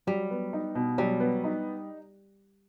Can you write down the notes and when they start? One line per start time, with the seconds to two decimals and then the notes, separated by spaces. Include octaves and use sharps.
0.07 F#3 G3
0.31 B3
0.53 D#4
0.75 B2
0.98 F#3 G3
1.20 B3
1.44 D#4